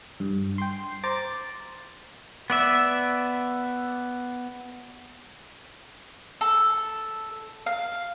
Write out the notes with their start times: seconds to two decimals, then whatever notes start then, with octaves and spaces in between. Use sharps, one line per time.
0.20 G2
0.58 G5 C6
1.04 C5 A#5 D6 A6
2.50 B3 D5 E5
6.41 A4
7.66 F5